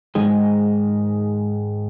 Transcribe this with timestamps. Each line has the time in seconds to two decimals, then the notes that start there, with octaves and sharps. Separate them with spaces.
0.15 G#2 D#3 G#3